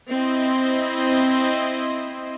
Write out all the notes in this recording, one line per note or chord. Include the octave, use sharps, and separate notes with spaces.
C4 E4 C5 D#5